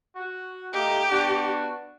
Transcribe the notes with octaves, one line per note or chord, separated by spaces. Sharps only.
F#4
A3 A#3 D#4 G4
B3 D4 F#4